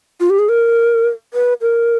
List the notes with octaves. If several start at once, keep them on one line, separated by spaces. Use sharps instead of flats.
F4
G4
G#4
A#4
B4
A#4